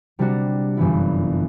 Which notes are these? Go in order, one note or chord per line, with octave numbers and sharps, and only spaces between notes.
C3 G3 D4 F#4
G1 F#2 E3 B3 E4